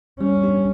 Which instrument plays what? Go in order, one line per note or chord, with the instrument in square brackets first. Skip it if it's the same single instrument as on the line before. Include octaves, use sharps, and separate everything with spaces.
[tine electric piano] G3 [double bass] C#4
[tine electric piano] B3 D4 G4